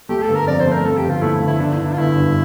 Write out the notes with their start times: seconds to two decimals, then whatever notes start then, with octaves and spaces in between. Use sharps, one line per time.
0.09 A3 G4
0.22 A4
0.28 G1
0.35 A#4
0.47 F2 D5
0.60 C5
0.66 A3
0.72 A#4
0.85 F2 A4
0.97 G4
1.03 G1
1.10 F4
1.22 A3 E4
1.35 E4
1.42 G1
1.48 E4
1.60 D3 D4
1.73 E4
1.78 G1
1.85 D4
1.93 F4
1.97 G1 E4
2.16 G2